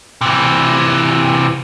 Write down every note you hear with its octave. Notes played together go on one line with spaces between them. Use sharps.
C3 E3